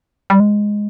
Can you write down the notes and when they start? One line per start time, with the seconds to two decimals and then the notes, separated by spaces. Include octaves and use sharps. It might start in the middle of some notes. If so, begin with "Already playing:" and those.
0.30 G3
0.40 G#3